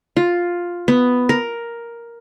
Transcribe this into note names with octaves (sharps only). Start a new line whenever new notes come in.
F4
B3
A#4